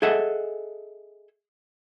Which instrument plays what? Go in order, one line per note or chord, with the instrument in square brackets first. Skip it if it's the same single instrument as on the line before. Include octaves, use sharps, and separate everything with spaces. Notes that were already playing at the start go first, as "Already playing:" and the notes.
[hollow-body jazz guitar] G#4 A4 D#5 E5 F#5